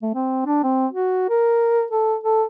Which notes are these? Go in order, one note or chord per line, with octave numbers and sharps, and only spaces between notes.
A3
C4
D4
C4
F#4
A#4
A4
A4